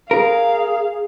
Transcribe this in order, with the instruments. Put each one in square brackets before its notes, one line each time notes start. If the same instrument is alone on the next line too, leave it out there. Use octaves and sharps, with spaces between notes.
[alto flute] G#4 [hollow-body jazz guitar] A#4 [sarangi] F5